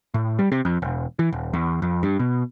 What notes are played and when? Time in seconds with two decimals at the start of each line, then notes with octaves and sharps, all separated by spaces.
0.14 A2
0.39 G3
0.52 C3
0.65 F2
0.82 E1
1.19 E3
1.33 D#1
1.53 E2
1.82 F2
2.03 G2
2.19 B2